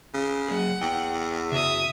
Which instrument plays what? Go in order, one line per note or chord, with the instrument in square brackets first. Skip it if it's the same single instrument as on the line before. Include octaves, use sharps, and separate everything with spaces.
[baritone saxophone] C#3
[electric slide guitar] F#3 A#3 G#4 [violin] F#5
[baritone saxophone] E2 [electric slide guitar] G5
[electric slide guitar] C#3 F#4 [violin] E5 D#6